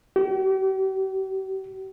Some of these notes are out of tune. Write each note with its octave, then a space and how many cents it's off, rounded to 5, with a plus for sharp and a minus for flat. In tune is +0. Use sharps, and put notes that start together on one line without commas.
G4 -45